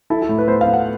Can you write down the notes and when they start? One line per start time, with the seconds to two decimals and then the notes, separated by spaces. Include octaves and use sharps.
0.10 E4 A4
0.22 A4
0.29 A2
0.38 B4
0.48 B3 C5
0.61 F5
0.67 B3
0.73 F#5